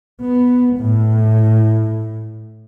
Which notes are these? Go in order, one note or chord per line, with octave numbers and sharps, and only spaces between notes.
B3
A2